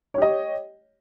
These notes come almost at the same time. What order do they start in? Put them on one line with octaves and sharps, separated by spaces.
C#5 G4 D#5